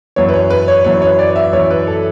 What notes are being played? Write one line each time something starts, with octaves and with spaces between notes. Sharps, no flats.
F#2 E3 C#5
B4
C#5
B4
C#5
F#2 E3 C#5
C#5
D5
E5
F#2 E3 C#5
B4
A4